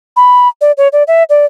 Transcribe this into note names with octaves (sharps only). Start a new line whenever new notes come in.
B5
D5
C#5
D5
E5
D5